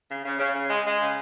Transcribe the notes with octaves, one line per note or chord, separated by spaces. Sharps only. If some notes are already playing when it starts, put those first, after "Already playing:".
C#3
C#3
C#3
C#3
G#3
G#3
C#3